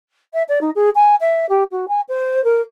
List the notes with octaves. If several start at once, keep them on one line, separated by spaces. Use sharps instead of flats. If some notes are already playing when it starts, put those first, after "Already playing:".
E5
D5
D#4
G#4
G#5
E5
G4
F#4
G#5
C5
A#4